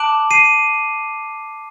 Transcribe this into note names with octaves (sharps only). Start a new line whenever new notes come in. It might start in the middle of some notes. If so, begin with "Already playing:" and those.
Already playing: A5 D6 F#6 D7 F#7
C7 D#7